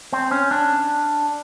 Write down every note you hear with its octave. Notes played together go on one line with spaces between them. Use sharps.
C4
C#4
D4